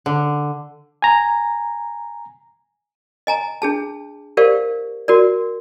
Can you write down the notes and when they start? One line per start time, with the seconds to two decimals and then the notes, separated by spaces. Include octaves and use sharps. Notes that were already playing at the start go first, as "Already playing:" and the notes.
0.06 D3
1.02 G#5 A#5
3.27 D#5 G#5 A#5
3.62 D4 G#4 A5
4.37 G4 A#4 C5 D5 F5
5.08 F#4 A#4 D5